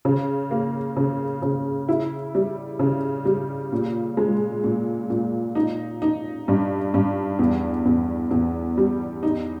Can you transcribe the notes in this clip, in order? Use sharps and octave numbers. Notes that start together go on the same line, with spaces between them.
C#3
A#3
C#3
C#3
E4
G3
C#3
G3
A#2
G#3
A#2
A#2
D#4
D#4
G2
G2
E2
E2
E2
G3
D#4